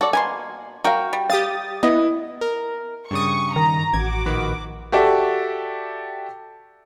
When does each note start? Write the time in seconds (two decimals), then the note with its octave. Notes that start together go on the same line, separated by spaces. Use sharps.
0.01 F#4 A4 D5
0.13 B2 A#3 G#5 C6
0.84 F#4 A#4 F5 G5
1.13 G3
1.30 G4 F5 D#6 A6
1.83 B3 E4 D#5
2.41 A#4
3.11 G2 C#3 C#6 D#6
3.56 D#3 A#5
3.94 A1 F#4 D6 G#6
4.26 A#1 D#3 B4
4.92 F#4 G4 A4 D5 E5